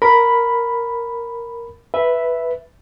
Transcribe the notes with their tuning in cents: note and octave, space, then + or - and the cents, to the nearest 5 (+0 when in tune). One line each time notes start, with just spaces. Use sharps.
A#4 +0 B5 +0
B4 -5 E5 +0